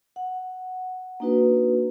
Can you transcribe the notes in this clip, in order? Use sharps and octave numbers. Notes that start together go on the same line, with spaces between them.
F#5
A#3 D4 D#4 F#4 B4